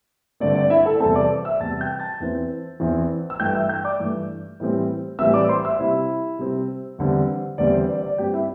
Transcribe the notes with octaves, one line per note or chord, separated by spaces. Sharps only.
G2 D3 A3 C4 D5
D5
E4 E5
A4 A5
E2 C3 G3 C4 A4 A5
D5 D6
E5 E6
E2 C3 G3 C4 A5 A6
G5 G6
A5 A6
E2 E3 C4
E2 E3 C4
E6
G2 E3 A3 G5 G6
E5 E6
G5 G6
D5 D6
G2 E3 A3
A2 E3 G3 C4
A2 E3 G3 C4 E5 E6
D5 D6
C5 C6
E5 E6
C3 G3 C4 E4 E5
C3 G3 C4
E2 D3 G3 C4
E2 D3 G3 C4 D5
C5
D5
D5
G2 G3 C4 G4 G5
E4 E5